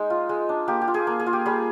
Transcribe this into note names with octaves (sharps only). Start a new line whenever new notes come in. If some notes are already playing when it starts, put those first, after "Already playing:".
Already playing: G#3 D#4
F4
G#3
D4
A#3 G4
G4
F4
G#4
A#3
G#4
F4
G4
G3 G#4